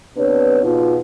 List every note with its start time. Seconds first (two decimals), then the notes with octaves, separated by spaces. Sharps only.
0.17 C3 B3 D4 B4 C#5
0.62 E2 B2 D#4 F4